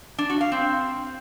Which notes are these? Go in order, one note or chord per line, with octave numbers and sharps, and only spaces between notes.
D4
F#4
F5
C4